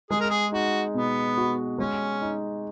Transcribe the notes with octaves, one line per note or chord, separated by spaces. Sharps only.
G#3 G#4
A#4
G#4
D#4 F#4
B2 B3
F#4
G#3 C#4
D#4